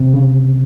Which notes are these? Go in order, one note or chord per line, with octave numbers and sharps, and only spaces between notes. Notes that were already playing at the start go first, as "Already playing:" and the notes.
Already playing: C3
C#3